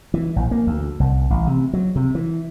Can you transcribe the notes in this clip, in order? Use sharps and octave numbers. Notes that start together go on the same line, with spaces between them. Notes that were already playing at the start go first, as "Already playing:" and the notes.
E3
A#1
A#3
D2
C2
A1
C3
F#3
C3
E3